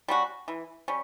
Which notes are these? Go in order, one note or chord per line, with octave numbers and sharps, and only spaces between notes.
G3 C#4 F#4
E3
G3 C#4